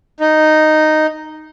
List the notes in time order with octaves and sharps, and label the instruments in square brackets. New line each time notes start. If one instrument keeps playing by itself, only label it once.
[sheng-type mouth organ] D#4